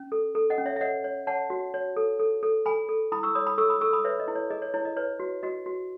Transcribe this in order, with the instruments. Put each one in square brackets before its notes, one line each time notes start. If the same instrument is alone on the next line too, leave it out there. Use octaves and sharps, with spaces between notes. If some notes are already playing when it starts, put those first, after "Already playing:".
Already playing: [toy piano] C#4
A4
A4
D#5 F#5
C#4
C#5 E5
E5
C#5 D#5 F#5
C#5
C#5 F#5 A5
F#4
C#5
A4
A4
A4
A4 G#5 B5
A4
E4 B5 D#6
C#6 E6
C#5 B5 D#6
B5 D#6
A4 C#6 E6
B5 D#6
A4 C#6 E6
B5 D#6
B4 C#5 E5
D#5
E4
C#5
G#4 D#5
C#5
E4 C#5
D#5
B4 C#5
F#4
F#4 D#5
F#4